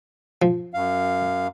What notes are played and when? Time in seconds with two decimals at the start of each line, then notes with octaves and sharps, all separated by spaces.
0.42 F3
0.74 F#2 F5